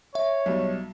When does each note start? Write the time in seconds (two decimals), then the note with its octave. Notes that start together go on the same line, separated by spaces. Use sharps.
0.15 C#5 E5
0.46 B1 G3